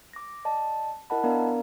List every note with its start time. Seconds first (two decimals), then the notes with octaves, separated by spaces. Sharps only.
0.13 D6 A#6
0.45 D5 D#5 A5
1.10 E4 A#4 D#5 F#5 A5 B5
1.24 B3 D4 A#4 D5 F5 A#5